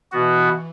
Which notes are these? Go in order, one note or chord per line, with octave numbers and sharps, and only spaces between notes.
B2 E3 B3 F#4